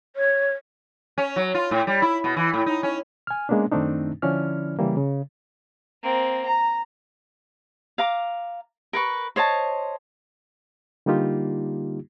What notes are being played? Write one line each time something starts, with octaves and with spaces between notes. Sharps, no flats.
C#5
C#4
F#3
F4
A2
G3
E4
B2
E3
A2
D#4
C#4
G#5 F6
G#3 A#3 B3 C#4 D4
F#2 D#3 A3 C4 D4 D#4
D3 F3 C#4 E4 D5 F6
C#3 E3 G3 A#3
C#3
A#3 C4
A#5
F5 A#5 D6
A#4 B4 C#6
C5 C#5 D#5 A5
D3 G3 A#3 D#4 F4 G4